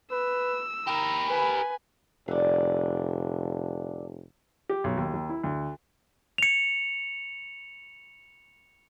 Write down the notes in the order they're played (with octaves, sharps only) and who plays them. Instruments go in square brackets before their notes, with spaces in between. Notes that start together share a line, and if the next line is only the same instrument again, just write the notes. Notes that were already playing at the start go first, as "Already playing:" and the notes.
[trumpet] B4 [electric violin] E6
[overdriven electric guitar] G4 A#4 [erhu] A#5 [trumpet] B5
[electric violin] B4 [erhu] G#5
[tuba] F1 [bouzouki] D3 D4
[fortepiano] G4
B1
D#2
D#2
E4
D2
[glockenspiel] C#7 F7